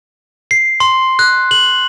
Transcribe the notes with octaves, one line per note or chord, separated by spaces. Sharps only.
C7
C6
F#6
F#7